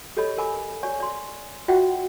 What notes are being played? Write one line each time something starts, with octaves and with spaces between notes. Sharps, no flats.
G4 A4 C#5 D#5 B5
A#4 G#5 B5 D6
C#5 D5 G#5 C#6
D5 C6
F4 F#4 D5 E5 F#5 G5